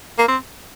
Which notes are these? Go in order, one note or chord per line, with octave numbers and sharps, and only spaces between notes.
A#3
C4